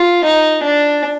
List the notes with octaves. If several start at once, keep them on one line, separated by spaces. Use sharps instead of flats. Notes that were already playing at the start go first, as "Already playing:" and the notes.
Already playing: F4
D#4
D4